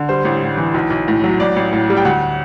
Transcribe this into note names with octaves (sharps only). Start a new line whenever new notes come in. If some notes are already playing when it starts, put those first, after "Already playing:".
Already playing: D3
G3 C5
A1
A2
E3
B1
B1
A2
F#3
A1 D5
A1
A2
G3
G5
D2 F#5